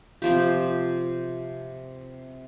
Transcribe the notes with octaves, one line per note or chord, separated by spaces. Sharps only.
C3 F3 G4